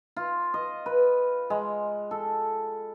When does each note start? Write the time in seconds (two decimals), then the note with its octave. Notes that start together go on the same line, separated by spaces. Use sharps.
0.16 F4
0.54 D#5
0.86 B4
1.50 G#3
2.11 A4